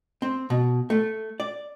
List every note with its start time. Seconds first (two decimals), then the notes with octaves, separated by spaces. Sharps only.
0.22 C4
0.50 B2
0.90 A3
1.40 D5